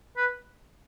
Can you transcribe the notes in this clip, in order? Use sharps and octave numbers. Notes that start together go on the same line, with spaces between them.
B4